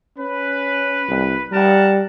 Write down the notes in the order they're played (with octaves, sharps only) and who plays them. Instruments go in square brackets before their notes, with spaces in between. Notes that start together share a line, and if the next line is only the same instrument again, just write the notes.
[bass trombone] C#4 [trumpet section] B4
[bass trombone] C2
[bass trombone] G3 [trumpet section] A#4 F#5 A5